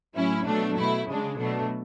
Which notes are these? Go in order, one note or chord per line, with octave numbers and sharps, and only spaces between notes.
A2 F#3 C#4 E4
B2 F#3 A3 D4
B2 A3 E4
C#3 G#3 D4
B2 F#3 A3 D4